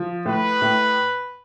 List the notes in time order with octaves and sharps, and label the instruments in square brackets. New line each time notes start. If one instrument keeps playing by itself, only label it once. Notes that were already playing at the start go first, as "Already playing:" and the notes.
Already playing: [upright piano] F3
[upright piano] A2 [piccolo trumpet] B4
[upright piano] A2